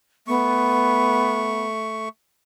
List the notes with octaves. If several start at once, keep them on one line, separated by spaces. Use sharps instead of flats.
A3 B3 C#6